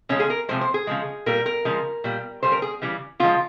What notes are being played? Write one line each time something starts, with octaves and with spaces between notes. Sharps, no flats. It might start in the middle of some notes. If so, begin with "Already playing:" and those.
C#3 F3 G#3 C#4
G#4
A#4
C3 F3 G#3 C5
C5
G#4
C#3 F3 G#3
A#2 G3 A#4
A#4
C#3 F3 G#3
A#2 G3
C#3 G3 C5
A#4
G#4
C#3 E3 G3
C#3 F3 G#3 F4